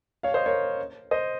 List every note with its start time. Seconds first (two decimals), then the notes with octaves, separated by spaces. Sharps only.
0.23 C#5 F5
0.34 C5 D#5
0.46 A#4 C#5
1.11 C5 D#5